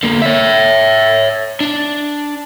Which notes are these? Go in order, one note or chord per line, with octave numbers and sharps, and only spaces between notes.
D3 A#3
C#5 E5
D4